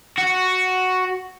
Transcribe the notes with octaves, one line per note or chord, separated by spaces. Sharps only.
F#4